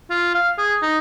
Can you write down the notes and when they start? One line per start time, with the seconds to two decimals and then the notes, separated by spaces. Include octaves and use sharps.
0.10 F4
0.35 F5
0.58 G#4
0.82 D#4